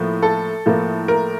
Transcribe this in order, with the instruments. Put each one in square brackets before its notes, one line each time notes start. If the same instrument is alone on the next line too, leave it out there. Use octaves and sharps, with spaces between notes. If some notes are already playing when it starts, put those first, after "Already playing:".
Already playing: [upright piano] A2 F3 A#3
A4
A2 F3 A#3
A#4